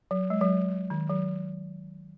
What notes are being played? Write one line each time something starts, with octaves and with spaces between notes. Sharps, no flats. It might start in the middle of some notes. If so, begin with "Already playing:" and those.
F#3
G#3
F#3
D#3
F#3